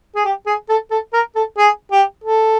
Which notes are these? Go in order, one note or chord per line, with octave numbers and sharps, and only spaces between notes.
G#4
G4
G#4
A4
A4
A#4
A4
G#4
G4
A4